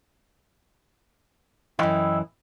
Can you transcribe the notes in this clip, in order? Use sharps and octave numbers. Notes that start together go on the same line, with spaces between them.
F#2 E3 E4 D#5 G5